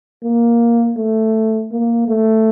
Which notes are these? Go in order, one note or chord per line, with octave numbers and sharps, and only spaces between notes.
A#3
A3
A#3
A3